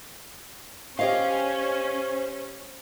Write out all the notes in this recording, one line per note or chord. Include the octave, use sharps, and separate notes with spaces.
C#4 G4 C5 D#5 F5